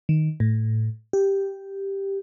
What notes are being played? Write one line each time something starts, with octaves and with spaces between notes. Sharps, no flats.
D#3
A2
G4